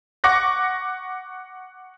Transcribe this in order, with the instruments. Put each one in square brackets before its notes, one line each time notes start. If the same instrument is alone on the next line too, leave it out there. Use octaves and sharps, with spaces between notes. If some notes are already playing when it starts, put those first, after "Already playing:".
[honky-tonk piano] F#5 C#6 D6 F#6 A#6